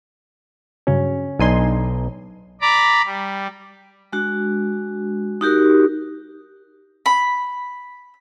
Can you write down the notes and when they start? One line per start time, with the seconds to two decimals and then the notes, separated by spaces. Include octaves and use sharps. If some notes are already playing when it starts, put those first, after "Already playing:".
0.87 G2 C#3 F#3 C#4
1.39 B1 D4 D#4 G#5 C6
2.61 D5 A#5 B5 D6
3.06 G3
4.13 G#3 D4 F#4
5.41 D#4 F#4 G4 A#4
7.06 B5